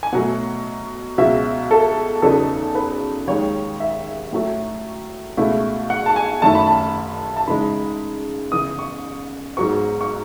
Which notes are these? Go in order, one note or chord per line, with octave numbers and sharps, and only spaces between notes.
G#5
B2 F#3 A3 F#5
C#2 B2 F#3 E5
A4
E2 C#3 F#3 B3 D#4 A4
B4
D#2 D#3 G#3 C#5
E5
A2 F#3 A3
C#2 B2 A3 E4
F#5
A5
G#5
F#2 D#3 A3 C#4 E4 A5
B5
A5
A5
C#3 E3 G#3 D#4 B5
C#3 E3 B3 D#6
C#6
G#2 F#3 B3 C#6
C#6